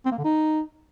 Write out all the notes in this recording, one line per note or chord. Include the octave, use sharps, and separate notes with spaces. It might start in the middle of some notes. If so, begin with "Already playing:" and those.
C4
A#3
D3
D#4